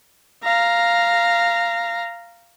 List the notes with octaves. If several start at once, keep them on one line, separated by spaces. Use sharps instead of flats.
F5 A#5